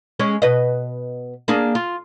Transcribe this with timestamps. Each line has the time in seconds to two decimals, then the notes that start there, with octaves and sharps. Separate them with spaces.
0.19 G#3 C#4 C#5
0.42 B2 B4 D#5
1.48 A#3 D4 G#4
1.75 F4